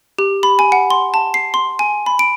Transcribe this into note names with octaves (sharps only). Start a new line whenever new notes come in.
G4
B5
G#5
F#5
C6
A5
C7
C6
G#5
B5
D7